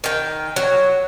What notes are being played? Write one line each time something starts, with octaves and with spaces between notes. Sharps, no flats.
D#3 G5
F#3